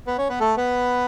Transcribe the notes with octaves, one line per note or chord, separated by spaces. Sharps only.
B3 B4
C#4 C#5
B3 B4
A3 A4
B3 B4